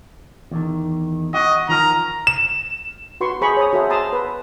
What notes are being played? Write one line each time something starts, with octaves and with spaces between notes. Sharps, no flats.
E2 D#3
F#4 D#5
D#3 F3 A#4 A#5
E7
F#4 B4 C6 C#6
G#4 C5 A#5 B5 C#6
C#5 A#5 D#6
F#4 G#4 A4 C5 E5 F#5
A5 A#5 C6 D#6
B4